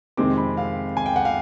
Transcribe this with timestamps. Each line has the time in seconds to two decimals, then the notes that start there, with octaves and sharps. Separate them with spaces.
0.17 F2 C3 D#3 G#3 C4 D6
0.37 B5
0.57 F5
0.97 G#5
1.06 G5
1.16 F#5
1.25 F5